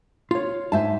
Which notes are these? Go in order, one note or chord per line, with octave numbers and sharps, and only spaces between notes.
F4 C#5
G#2 C5 E5 G#5 A5